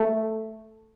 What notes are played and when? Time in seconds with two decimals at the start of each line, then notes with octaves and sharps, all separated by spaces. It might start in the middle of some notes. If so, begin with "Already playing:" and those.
Already playing: A3